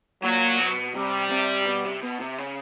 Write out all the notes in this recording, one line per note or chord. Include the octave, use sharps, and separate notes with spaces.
A#2 F#3
B2
C3 G3
C3
B2
C3
B2
C3
C#3